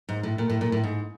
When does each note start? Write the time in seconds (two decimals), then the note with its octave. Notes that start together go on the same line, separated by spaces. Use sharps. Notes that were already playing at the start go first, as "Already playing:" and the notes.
0.09 G#2
0.23 A2
0.38 A#2
0.50 A2
0.61 A#2
0.72 A2
0.83 G#2